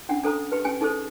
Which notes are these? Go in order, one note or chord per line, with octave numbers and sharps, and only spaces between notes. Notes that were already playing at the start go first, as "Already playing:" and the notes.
C#4 D4 F#5
D4 A4 C5 A#5 D#6
G4 B4
C#4 G4 G5 G#5
D#4 G#4 A4 C5